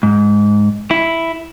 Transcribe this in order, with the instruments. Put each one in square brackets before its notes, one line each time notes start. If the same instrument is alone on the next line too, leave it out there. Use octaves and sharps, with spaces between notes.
[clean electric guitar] G#2
E4